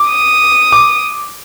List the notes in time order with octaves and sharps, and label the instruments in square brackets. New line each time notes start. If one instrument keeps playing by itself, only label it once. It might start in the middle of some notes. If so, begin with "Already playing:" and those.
Already playing: [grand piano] D6
[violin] D#6
[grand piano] D6